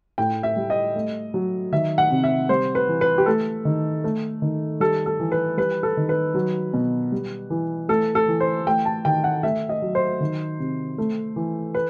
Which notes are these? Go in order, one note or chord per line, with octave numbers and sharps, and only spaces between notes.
A2 G5
E5
G3
D#5
A3
F#3
D#3 E5
F#5
C3
E5
G3 C5
B4
E3
B4
G4
A3 A4
D#3
A3
D#3
G3 A4
A4
E3
B4
G3 B4
A4
D#3
B4
F#3
B2
G3
E3
A3 A4
A4
E3
C5
A3 G5
A5
D#3 G5
F#5
A3 E5
D#5
F#3
C5
D#3
C3
A3
E3
B4